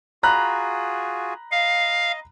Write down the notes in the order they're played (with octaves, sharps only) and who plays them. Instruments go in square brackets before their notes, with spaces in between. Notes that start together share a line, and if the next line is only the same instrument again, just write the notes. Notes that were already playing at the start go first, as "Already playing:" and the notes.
[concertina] F4 F#4 G#4 [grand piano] A#5 B5 F#6
[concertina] D#5 [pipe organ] F5